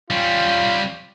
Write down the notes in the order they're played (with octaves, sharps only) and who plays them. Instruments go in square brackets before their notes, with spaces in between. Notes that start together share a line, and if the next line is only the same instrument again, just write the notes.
[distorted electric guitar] G3 C#4 [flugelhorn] F4